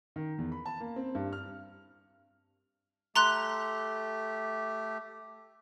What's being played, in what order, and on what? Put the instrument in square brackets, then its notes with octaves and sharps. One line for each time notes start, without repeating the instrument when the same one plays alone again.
[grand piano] D#3
E2
B5
A5
A#3
C4
G2
F6
[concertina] A3 G4 [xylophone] A#5 C6 F#6